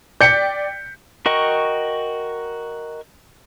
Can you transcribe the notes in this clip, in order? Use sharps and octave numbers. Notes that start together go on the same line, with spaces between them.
D5 G5 G6 B6 C#7
F#4 A#4 D#5 G5 C#6